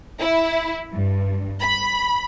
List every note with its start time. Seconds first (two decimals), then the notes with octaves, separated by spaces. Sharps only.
0.19 E4
0.93 G2
1.61 B5